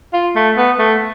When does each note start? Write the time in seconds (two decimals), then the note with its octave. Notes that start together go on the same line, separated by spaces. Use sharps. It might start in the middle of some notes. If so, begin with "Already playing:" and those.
0.14 F4
0.36 A3
0.57 B3
0.79 A3